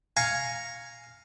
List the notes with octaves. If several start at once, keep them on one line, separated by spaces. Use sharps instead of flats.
F5 G#5 A#5 C#6